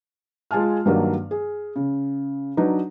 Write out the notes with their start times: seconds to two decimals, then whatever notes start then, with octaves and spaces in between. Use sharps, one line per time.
0.51 G#3 F4 G#5 A5 F6
0.85 G2 D#3 F#3 A#3 D4
1.31 G#4
1.76 C#3
2.57 F#3 D4 D#4 B4